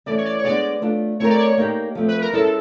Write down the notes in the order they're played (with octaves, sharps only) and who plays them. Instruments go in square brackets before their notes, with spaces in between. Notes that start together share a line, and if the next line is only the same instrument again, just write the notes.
[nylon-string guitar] E3 A3 C#4 [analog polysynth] D5
[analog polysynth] C#5
D5
C#5
[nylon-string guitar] G#3 B3 D4 F4 G#4 [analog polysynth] D5
[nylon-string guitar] A3 D4 F4
[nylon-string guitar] A3 C4 E4 G4 A#4 [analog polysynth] C#5
[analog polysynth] D5
C#5
[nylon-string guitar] A#3 D#4 G4
F3 A3 C4
[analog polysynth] B4
A#4
[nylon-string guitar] G#3 C#4 E4 [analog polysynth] A4